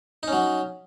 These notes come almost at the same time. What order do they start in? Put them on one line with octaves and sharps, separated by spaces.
D#4 C#4 F#3